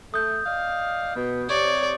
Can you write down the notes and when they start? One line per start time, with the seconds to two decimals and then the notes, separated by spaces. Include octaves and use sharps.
0.14 A3 D#6 G6
0.46 D5 D#5 F5
1.16 B2
1.49 C3 C#5 D5